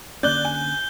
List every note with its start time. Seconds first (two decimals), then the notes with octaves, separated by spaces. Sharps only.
0.23 D3 A#3 C#4 D5 F#6 G6 G7
0.45 G#5